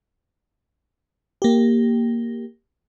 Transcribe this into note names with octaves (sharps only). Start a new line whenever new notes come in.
A#3 G4